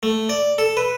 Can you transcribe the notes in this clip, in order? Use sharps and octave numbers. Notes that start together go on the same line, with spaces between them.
A3
D5
A4
B4